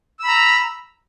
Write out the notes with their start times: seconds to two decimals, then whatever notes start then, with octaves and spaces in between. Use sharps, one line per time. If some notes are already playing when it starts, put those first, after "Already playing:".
0.19 E6
0.24 B5
0.28 A#5